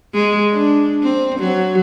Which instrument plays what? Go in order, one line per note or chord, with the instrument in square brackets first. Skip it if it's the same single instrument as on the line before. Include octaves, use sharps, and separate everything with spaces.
[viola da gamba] G#3
D4
C4
F#3